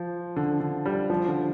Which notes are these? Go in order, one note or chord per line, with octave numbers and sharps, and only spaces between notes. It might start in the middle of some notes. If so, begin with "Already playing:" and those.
Already playing: F3
D3
D3
G3
F3
D3